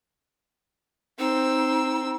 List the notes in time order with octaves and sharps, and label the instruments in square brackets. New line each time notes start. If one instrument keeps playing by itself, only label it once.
[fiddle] C4 E6 [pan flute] D#4